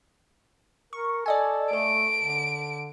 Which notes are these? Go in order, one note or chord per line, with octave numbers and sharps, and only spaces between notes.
A#4 C#6
A4 D5 D#5 G#5
A3 A4 D7
D3